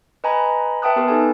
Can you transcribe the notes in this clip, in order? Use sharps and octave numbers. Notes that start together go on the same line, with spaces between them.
B4 D#5 G#5 A#5 B5
B4 E5 G5 A5 D#6 F#6
B3 G4 A#4 B4
D#4 G4 A4 B4 G#5